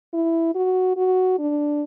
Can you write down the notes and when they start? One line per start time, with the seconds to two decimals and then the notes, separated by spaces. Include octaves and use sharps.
0.14 E4
0.55 F#4
0.97 F#4
1.39 D4